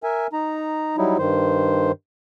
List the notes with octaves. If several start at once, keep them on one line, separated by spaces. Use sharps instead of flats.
A#4 E5 G#5
D#4 A#5
F#3 G3 D#4 E4
G2 D#3 C5